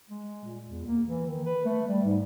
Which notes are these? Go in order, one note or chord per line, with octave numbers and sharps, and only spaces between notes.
G#3
A#2
E2
A#3
E3
D#3
B4
A3
G3
G#2